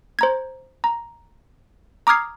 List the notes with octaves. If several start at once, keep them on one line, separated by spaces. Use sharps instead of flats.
C5 A#5 G#6
A#5
A#5 D6 D#6 F6 G#6 C7